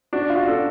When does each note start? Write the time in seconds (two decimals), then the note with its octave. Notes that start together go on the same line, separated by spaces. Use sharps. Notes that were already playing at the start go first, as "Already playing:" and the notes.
0.13 D4 F#4
0.30 F4
0.35 F#4
0.46 D4 A4